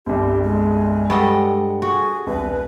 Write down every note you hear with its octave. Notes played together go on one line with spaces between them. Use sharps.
G1 C2 G4
G#3
G2 G3 A4 D#5 F#5
F#4 G#4
E1 C2 B4